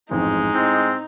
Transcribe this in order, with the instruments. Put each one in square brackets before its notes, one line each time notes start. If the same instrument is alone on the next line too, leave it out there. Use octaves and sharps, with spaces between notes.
[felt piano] A1 F2 G#2 [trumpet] G#3 [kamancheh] D#4
[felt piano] A2 [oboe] C4